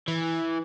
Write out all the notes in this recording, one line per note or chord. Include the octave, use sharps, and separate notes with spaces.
E3